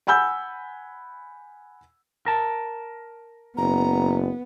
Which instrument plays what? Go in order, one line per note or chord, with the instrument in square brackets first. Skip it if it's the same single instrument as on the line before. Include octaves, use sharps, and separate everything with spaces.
[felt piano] F#5 G#5 B5 E6 G6
[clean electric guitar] A#4 A5
[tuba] F#1 [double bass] B3 [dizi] A#5